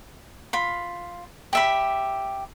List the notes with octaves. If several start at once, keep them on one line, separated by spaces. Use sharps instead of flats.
F4 B5
G4 E5 B5